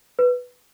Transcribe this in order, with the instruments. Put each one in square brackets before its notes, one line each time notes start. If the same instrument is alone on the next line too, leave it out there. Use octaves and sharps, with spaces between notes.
[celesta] B4